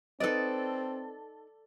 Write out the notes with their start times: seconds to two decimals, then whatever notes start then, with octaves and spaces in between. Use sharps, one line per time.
0.20 C4 D#4 A4 B4 D5 D#5